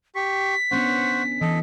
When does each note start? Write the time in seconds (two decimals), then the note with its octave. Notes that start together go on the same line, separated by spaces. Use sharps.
0.15 G4 C#6 B6
0.71 B3 C#4 D4 C5 F#5 C#6
1.41 E3 A4 D#5